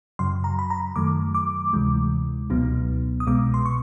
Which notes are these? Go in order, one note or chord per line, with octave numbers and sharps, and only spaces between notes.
F#2 C#3 F#3 C6
A#5
B5
A#5
F#2 D#3 F#3 A3 D6
D6
D2 C3 E3 G#3
C#2 B2 F#3 B3 D#4
D#6
C2 B2 G#3 B3 D6
C6
C#6